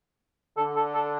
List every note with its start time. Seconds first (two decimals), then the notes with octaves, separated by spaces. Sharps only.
0.57 D3 A4
0.76 A4
0.94 A4